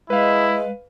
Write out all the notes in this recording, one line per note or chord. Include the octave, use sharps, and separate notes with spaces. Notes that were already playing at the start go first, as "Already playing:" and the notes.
G#3 E4 B4 F5